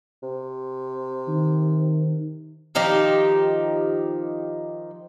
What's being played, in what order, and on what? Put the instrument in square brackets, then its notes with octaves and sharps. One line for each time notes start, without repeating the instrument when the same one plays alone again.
[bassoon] C3
[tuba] D#3
[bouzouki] D#3 F3 D#4 G4